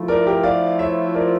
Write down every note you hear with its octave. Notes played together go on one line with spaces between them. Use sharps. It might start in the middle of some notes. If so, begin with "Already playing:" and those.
Already playing: F3 A3 E4
A#4 D5
G4 A#4
D5 F5
C#5 E5
A#4 D5